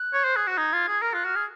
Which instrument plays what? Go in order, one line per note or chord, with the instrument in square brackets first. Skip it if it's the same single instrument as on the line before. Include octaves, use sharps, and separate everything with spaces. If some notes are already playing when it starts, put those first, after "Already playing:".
Already playing: [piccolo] F#6
[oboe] C#5
C5
G#4
F#4
[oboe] D#4 [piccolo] G#6
[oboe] F4
G#4
[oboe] A#4 [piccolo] F6
[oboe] F4 [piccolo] F#6
[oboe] F#4 [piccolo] F6
[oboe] G#4